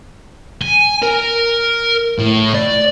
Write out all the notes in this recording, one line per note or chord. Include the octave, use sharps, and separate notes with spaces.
G#5
A#4
A2
D5